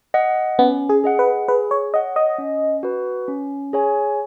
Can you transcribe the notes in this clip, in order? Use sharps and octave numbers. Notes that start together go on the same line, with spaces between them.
D#5 F#5
B3 C#4
G#4
G#4 D#5 F#5
B4
G#4 B4
C#5
C#5 D#5 F#5
D#5
C#4
F#4 B4
C#4
G#4 C#5 G#5